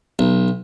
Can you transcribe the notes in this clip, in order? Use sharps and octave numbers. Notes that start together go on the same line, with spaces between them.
B1